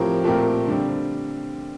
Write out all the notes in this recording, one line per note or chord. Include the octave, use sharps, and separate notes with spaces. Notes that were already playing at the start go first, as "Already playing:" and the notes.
Already playing: A2 F3 C4 G4 A#4
A#2 A3 C4 G4 A#4
D3 G3 C4